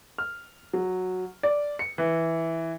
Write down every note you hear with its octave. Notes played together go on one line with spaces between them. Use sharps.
F6
F#3
D5
C#7
E3